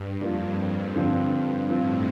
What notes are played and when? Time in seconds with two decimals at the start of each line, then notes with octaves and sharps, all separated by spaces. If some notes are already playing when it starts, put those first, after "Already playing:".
Already playing: G2
0.21 F2 G3 A#3 F4
0.95 G2 D3 F3 C4
1.70 A2 F3 C4 F4